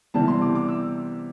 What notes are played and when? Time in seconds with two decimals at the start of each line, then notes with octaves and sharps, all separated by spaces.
0.14 C3 E3 G3 B3 A5
0.28 C6
0.42 D6
0.55 D6
0.69 E6